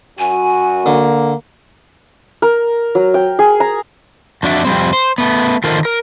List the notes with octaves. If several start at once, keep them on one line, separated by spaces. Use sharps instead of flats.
F#2 F#4 G#5
D3 A#3
A#4
F#3
G5
G#4
A#5
F2 D4 F#4 D5 E5
F2 G3 C4
C5
A3 B3
D#3 F4 A4 A#4 C5
A#4